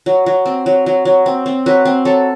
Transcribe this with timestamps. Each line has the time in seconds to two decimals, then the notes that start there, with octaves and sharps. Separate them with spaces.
0.06 F#3
0.26 F#3
0.45 C4
0.66 F#3
0.86 F#3
1.05 F#3
1.26 C4
1.46 C4
1.66 F#3 B4
1.85 C4
2.05 F#3 A4